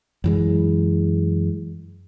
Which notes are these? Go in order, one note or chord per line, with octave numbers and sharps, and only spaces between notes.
F#2 E3 G#3